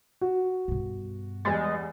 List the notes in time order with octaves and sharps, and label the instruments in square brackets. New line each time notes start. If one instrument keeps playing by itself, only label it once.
[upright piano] F#4
[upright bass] G2 B2
[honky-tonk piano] E2 G3 A6 [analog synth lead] G#3